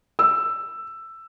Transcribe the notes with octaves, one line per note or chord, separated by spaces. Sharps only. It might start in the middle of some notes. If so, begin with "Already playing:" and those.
E6